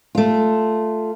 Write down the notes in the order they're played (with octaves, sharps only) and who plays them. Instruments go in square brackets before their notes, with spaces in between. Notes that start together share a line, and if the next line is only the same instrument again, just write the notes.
[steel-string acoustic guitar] A3 F4